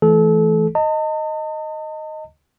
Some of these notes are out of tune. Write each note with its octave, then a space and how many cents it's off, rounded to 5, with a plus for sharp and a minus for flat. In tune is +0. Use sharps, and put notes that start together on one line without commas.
E3 +5 A3 -20 A4 -30
D#5 +0 A5 +45